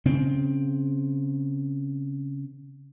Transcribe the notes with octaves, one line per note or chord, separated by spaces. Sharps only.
C#3 C4